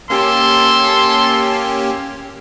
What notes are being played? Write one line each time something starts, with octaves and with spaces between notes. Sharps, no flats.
A#3 C#4 G4 A4 C6